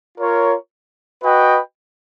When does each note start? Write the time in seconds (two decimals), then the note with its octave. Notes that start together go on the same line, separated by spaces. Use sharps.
0.17 F4 A#4 C#5
1.23 F#4 B4 D#5 G5